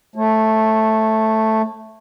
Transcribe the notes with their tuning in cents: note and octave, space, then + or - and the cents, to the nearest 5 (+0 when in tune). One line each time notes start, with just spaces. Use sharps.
A3 +0 C#5 -35